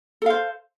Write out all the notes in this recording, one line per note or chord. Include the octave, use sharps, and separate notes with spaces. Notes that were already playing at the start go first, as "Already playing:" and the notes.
A4 C5 F5